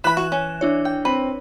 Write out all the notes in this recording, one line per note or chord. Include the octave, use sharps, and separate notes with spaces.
E3 B4 B5 F#6 E7
F#4
C#4
D4 E4 C#5
G5
C4 B4